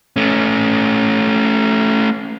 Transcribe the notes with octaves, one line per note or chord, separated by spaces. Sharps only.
A3 C#4